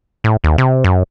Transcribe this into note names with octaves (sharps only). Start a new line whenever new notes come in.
A2
D#2
C3
F#2